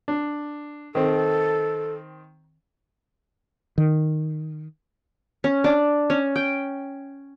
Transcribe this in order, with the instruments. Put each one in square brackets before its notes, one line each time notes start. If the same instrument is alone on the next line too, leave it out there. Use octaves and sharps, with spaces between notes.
[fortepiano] D4
[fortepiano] D#3 C4 [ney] A4
[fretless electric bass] D#3
[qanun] C#4
D4
C#4
G5